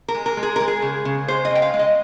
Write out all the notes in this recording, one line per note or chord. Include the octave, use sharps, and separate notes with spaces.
A#4
G#3
A#4
G#3
G#4
G#3 A#4
G#4
C#3
C#3
G#3 C5
D#5
C#3 G5
F5
G#3
D#5